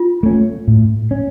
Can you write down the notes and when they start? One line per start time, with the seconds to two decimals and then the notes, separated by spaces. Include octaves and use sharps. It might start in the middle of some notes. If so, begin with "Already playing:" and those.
Already playing: F4
0.23 A3 C#4
0.68 A2
1.11 C#4